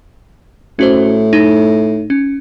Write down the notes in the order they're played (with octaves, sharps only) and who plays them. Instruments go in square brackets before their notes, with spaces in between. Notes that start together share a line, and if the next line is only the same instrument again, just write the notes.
[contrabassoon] A2 [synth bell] C#4 F#4 C5
[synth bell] D#4
C#4